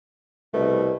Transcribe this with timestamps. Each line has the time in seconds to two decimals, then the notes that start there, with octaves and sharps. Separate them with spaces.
0.54 C2 B2 A3